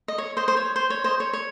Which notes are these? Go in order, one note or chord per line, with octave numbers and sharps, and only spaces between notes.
D#5
C#5
C5 D#5
C5
C#5
C5
C#5
C5 D#5
C#5
C#5